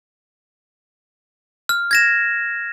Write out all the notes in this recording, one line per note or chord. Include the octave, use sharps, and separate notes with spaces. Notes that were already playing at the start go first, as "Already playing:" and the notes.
F6
G#6 A#6 E7